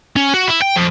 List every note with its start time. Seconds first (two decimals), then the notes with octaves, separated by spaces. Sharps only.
0.16 C#4
0.34 F#4
0.47 E4
0.62 G5
0.76 F2